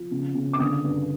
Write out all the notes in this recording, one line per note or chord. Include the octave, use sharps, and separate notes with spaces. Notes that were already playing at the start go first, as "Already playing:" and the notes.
Already playing: F3
C#3
C#3
D6
D3 D#6
G2